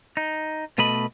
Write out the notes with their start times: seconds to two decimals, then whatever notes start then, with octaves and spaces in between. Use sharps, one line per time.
0.17 D#4
0.78 B2 A3 B4 D#5 B5